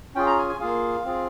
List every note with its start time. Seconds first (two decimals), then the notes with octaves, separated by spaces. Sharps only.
0.15 C#4 F4 G#4 G5
0.26 A#5
0.38 G#5
0.49 G#5
0.60 A#3 F4 G#4 F5
1.05 C4 F4 G#4